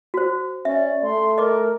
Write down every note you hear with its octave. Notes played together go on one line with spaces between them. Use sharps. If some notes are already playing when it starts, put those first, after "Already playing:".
F#4 C5
C#4 D5 E5
A3 C6
A#4 D#5 D6